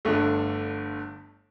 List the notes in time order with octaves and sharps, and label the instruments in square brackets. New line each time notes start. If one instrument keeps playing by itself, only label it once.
[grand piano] G1 G2 D3 A3